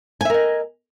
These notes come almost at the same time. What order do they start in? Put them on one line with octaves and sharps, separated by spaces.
G#5 E5 A#4 D#5